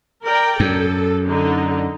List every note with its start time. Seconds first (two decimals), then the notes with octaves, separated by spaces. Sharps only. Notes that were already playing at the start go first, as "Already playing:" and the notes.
0.24 A#4 D5 G5
0.60 F#2 A4
1.28 D3 D#4